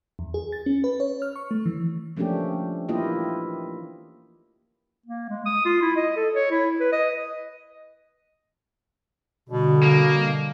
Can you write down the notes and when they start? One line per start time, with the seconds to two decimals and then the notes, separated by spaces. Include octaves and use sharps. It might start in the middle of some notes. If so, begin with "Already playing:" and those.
0.19 E2
0.34 G#4
0.52 A6
0.66 C#4
0.84 B4
1.00 C#5
1.22 F6
1.36 C#6
1.51 A3
1.66 E3
2.17 F3 A3 A#3 C#4 D4 G4
2.89 E3 A#3 E4 F4 G4 D#5
5.06 A#3
5.30 G#3
5.46 D#6
5.65 F4
5.82 E4
5.96 D#5
6.17 A4
6.34 C#5
6.51 E4
6.80 B4
6.92 D#5
9.49 B2 D3 G3
9.83 A#3